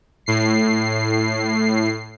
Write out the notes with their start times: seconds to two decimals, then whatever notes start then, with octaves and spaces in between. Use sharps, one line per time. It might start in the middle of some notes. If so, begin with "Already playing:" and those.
0.26 A2 C7